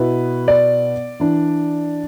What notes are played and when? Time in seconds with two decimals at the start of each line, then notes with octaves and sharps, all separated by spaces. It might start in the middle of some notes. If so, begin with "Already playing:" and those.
Already playing: B2 B3 E4 B4
0.48 D5
1.20 E3 D4